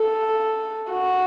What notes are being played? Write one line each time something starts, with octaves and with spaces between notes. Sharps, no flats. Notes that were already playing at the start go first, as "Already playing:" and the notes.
Already playing: A4
F#4